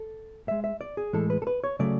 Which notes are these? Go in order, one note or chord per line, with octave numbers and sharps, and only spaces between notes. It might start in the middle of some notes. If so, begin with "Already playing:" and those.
Already playing: A4
A2 G#3 E5
E5
D5
G#4
A2 E3 G#3 A4
B4
A4
B4
C#5
C#3 F#3 A3 D5